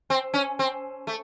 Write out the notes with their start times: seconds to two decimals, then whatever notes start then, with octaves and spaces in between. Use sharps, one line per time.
0.10 C4
0.34 C#4
0.59 C4
1.07 A3